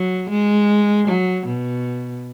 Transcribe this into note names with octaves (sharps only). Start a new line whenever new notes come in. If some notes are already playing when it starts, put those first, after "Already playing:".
Already playing: F#3
G#3
F#3
B2